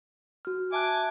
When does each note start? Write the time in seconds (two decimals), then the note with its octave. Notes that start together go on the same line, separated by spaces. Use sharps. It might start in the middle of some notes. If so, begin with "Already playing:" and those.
0.45 F#4 F6
0.72 E5 G#5 A5 D6 F#6